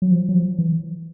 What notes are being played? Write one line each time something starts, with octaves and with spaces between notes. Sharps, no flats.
F#3
F3
F#3
F3
E3